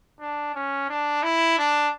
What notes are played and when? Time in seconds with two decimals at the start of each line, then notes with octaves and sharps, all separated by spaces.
0.20 D4
0.55 C#4
0.89 D4
1.23 E4
1.58 D4